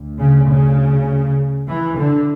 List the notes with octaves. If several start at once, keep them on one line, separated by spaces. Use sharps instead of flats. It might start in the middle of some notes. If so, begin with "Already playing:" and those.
Already playing: D2
C#3
C#3
E3
D3